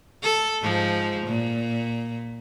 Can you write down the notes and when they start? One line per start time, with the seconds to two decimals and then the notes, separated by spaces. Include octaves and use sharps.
0.23 A4
0.62 G#2 F3
1.27 A#2